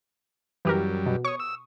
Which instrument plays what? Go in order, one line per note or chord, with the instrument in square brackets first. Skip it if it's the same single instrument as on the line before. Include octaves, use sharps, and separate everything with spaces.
[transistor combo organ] F#2 G3 [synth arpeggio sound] E3 G4 A#4
[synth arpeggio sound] B2
[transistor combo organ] C#5 [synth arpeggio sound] C#6 D#6
[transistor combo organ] E6